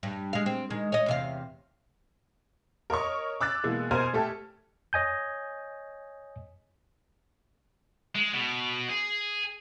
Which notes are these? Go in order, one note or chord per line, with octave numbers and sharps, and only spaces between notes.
G2
G#3 F5
C4
D#3 G#3
C#5 D#5
E2 C3 F5
A#4 C#5 D#5 C#6
D6 E6 F#6 A6
B2 E3 G#3 A#3
B2 A#4 C5 G#5 F6 G#6
A3 G4 A4
C#5 D#5 G#5 G6
G#3
B2
G#4